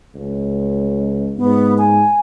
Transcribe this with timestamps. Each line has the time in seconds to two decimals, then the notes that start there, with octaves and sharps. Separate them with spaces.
0.14 C#2
1.37 G#2 B3
1.78 G#5